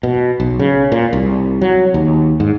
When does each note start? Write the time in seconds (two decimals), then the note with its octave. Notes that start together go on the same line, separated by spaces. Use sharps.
0.03 B2
0.40 B1
0.59 C#3
0.92 A#2
1.13 C2
1.61 F#3
1.94 D#2
2.40 G#2